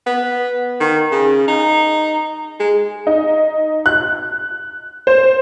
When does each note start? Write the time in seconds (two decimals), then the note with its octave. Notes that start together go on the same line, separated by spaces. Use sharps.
0.06 B3
0.80 D#3
1.11 C#3
1.48 D#4
2.60 G#3
3.07 D#4
3.86 F#6
5.07 C5